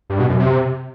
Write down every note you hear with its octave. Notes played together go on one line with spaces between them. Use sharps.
G2
B2
F#2
C3